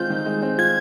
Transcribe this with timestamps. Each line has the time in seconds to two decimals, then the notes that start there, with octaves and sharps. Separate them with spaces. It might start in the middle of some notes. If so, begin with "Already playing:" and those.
Already playing: D#3 G#3 C4 F4 G6
0.10 D#3
0.25 G#3
0.42 C4
0.58 F4 G#6